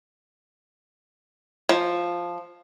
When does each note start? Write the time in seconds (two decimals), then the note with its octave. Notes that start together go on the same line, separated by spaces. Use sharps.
1.69 F3